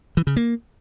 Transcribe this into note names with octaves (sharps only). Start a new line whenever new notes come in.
E3
C#3
A#3